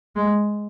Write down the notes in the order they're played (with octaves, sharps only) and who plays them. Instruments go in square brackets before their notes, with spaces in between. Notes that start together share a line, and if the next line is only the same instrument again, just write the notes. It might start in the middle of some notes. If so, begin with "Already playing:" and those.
[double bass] G#3